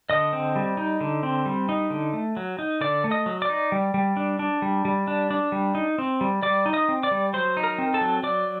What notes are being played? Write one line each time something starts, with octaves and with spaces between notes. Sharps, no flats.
D3 D#5 D#6
C4
G3
D#4
D3
C4
G3
D#4
D3
A3
F#3
D#4
D3 D5 D6
A3
D#5 D#6
F#3
D5 D6
D#4
G3
G3
D4
D4
G3
G3
D4
D4
G3
D#4
C4
G3
G3 D5 D6
D#4
D#5 D#6
C4
D5 D6
G3
F#3 C5 C6
D#4
A#4 A#5
C4
A4 A5
F#3
F#3 D5 D6